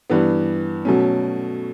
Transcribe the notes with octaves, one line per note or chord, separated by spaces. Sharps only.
G2 E3 B3
B2 F#3 A3 C#4